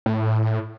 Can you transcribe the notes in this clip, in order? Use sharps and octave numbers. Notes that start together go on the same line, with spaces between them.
A2